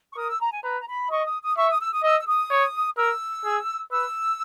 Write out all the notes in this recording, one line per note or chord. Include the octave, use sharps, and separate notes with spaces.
C#6
A#4 D#6
E6
A#5
G#5
B4 A#5
A#5
B5
D#5 C#6
D#6
D#6
E5 C#6
D#6
E6
D#6
D#5 E6
E6
D#6
C#5
A#4 E6
G#4
B4 E6